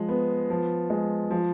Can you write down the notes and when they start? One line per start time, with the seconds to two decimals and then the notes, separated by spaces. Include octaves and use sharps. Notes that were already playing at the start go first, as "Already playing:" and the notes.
Already playing: F3 G#3
0.09 B3
0.50 F3
0.90 G#3
1.30 F3